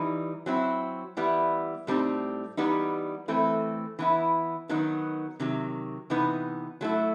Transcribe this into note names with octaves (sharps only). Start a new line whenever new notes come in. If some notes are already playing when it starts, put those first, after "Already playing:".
Already playing: E3 G3 D#4
F#3 C4 E4
E3 G3 B3 E4
A2 G3 C4 D#4
E3 G3 B3 D#4
E3 A3 C4
E3 B3 E4
D#3 F#3 B3 D#4
C3 D#3 F#3
C3 E3 B3 D#4
F#3 A3 E4